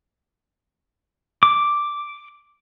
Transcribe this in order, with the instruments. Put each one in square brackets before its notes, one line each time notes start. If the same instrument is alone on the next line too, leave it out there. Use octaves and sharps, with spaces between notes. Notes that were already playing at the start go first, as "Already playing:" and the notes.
[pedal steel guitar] D6